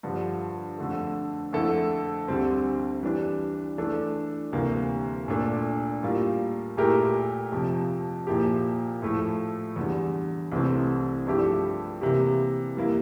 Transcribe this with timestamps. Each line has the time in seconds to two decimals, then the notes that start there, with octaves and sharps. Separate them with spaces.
0.03 G2 D3 F3
0.78 F2 D3 A3
1.53 F2 D3 A3 E4 A4
2.28 D2 D3 G3 C4
3.03 E3 G3 D4
3.78 E3 A3 D4 A4
4.53 D2 C3 E3 G3 A#3
5.28 A#2 A3 D4 A4
6.03 A2 G3 A#3 F4
6.77 A#2 A3 E4 G4 A#4
7.52 F2 C3 F3
8.27 A#2 F3 A#3 E4 G4
9.02 A2 F3 A3 E4
9.76 E2 D3 G3
10.52 C2 C3 E3 A3 C4
11.27 G2 F3 A3 E4 G4
12.01 C3 E3 A#3 E4 G4
12.76 E3 G3 A#3 E4